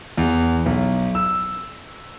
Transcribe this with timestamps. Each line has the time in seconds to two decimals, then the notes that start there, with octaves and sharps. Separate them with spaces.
0.17 E2
0.66 B1
1.15 E6